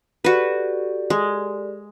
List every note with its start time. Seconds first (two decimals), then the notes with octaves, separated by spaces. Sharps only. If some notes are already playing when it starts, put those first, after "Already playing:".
0.24 F#4 G4 A4 B4 D5
1.10 G#3